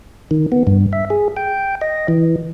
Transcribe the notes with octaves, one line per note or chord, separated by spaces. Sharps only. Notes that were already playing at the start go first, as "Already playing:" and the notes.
D#3
B3
G2
E5
G#4
G5
D#5
E3